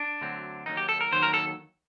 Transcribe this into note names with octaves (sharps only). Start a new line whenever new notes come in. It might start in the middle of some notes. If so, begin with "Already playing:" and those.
Already playing: D4
D2 D3 F#3 C4
D#2 D#3 F#3 D#4
G4
A4
A#4
D#2 D#3 F#3 C5
A#4
A4